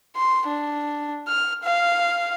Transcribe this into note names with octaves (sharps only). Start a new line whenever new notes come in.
C6
D4
F6
F5